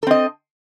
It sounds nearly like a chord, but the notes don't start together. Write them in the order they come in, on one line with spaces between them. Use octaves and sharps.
A4 C4 D#5